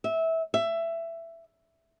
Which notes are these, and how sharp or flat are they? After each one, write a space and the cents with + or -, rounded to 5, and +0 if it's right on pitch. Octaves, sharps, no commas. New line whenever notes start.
E5 -20
E5 +15